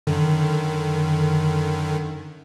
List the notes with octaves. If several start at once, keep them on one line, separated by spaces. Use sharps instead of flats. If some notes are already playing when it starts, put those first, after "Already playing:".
F#2 D3 D#3